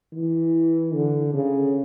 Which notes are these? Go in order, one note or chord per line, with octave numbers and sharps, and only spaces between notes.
E3
D3
C#3